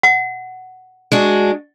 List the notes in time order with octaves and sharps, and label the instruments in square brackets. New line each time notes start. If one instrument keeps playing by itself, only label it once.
[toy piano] F#5
[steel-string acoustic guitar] G#3 D4 F#4